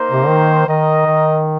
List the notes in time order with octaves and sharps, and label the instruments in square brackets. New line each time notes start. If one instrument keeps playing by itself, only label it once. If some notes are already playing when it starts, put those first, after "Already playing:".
Already playing: [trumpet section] A#3 D#4 C5
[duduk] C3
D#3
[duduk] D#3 [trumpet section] D#4 A#4 D#5
[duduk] D#3